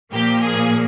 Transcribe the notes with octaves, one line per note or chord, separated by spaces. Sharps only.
A#2 F3 A#3 G4
G#4